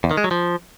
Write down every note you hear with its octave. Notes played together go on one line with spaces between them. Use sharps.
E2
D#3
G#3
F#3
F3